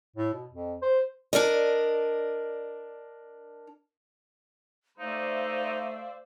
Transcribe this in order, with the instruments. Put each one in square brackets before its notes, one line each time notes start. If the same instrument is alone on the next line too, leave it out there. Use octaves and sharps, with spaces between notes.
[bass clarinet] A2
B2
F2
C5
[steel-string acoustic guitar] D4 A#4 D5 D#5
[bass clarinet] A3 [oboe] D#4 [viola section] C5 D5 E5 [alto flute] F5